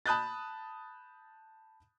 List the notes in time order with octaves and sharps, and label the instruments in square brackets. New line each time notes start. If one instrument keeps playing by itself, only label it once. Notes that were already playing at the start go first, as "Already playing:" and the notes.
[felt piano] A5 B5 D#6 F#6 G6 A6